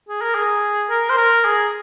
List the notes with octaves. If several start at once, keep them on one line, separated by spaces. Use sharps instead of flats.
G#4
A#4
G#4
A#4
C5
A#4
G#4